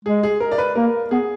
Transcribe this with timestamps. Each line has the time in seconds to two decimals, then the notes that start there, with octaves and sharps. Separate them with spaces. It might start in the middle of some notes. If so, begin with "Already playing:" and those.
0.05 G#3 G#4
0.23 G#4
0.40 A#4
0.51 D5
0.58 B4
0.75 A#3 A#4
1.11 B3 G#4